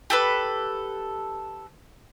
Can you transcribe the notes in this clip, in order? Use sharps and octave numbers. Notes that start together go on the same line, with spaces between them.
G4 A4 B4